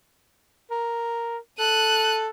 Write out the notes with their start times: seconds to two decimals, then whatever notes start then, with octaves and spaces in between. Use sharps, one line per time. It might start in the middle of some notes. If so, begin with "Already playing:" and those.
0.71 A#4
1.59 A4 F#6 D#7